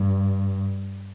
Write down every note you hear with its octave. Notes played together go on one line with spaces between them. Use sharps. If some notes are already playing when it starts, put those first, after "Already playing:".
Already playing: G2